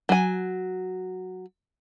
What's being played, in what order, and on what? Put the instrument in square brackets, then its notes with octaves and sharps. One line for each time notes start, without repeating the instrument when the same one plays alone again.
[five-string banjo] F#3 G#5